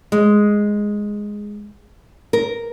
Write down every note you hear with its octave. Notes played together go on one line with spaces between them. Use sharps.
G#3
A#4